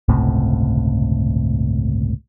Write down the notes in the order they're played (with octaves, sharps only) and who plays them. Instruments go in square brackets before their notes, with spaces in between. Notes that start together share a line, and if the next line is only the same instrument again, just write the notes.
[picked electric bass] G1 C#2 A2 C3